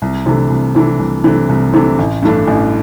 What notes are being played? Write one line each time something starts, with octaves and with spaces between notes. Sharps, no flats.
C2
C3 E3 A3 D4
C2
C3 E3 A3 D4
C2
C3 E3 A3 D4
C2
C3 E3 A3 D4
A1
G2 E3 A3 D4
A1